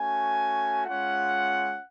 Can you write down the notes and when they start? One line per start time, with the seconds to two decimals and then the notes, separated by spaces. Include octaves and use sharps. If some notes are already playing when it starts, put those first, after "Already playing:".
Already playing: A3 C#4 F#4 G#5
0.86 G#3 C#4 F4 F#5